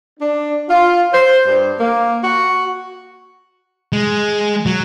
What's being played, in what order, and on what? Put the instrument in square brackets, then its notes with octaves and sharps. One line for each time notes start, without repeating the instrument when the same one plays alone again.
[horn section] D4
F4
C5
G2
A#3
F#4
[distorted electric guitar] G#3
F#3